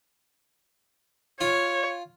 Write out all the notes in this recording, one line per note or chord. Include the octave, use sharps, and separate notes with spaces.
F4 C#5